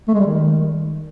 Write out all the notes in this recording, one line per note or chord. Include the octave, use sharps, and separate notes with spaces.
A3
G#3
G3
D#3